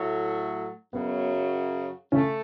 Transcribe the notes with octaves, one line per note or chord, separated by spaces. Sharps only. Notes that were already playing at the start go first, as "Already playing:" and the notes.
Already playing: A2 F#3 A3
F#2 C#3 F#3 B3
C#3 A3 C#4